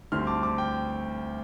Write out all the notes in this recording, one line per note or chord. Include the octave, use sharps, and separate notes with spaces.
D2 D3 G3 C4 C6 F6
A5 D6
A5 D6
G5